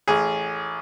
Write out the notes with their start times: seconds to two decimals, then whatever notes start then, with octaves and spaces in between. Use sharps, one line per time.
0.08 A1 G#4